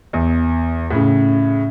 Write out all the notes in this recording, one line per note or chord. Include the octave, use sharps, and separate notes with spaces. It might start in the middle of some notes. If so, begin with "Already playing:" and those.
E2
A2 C#3